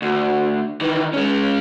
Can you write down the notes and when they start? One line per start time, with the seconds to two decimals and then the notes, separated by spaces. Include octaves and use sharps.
0.02 D2
0.81 D#3 E3
1.13 G#3 C#4